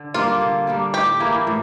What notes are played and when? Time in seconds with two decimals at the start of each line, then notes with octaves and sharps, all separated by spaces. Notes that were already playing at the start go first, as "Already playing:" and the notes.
Already playing: D3
0.14 G3 A#3 D4 F4
0.41 D3
0.67 G3 A#3 D4
0.94 A2 G4
1.20 E3 A#3 E4
1.47 A2